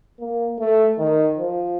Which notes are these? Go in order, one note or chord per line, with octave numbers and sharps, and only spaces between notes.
A#3
A3
D#3
F3